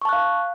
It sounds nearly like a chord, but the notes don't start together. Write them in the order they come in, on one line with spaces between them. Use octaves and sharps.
C#6 A5 F#6 F5